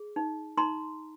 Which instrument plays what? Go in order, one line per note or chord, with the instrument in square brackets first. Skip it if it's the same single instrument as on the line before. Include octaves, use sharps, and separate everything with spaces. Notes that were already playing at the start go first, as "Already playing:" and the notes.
Already playing: [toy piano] G#4
D#4
D#4 A#5 C6